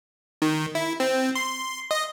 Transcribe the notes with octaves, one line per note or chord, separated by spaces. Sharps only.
D#3
E4
C4
C6
D#5